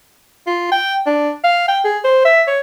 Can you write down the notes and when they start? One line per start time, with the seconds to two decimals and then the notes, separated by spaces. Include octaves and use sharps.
0.47 F4
0.72 G5
1.06 D4
1.44 F5
1.68 G5
1.85 G#4
2.04 C5
2.25 E5
2.47 C#5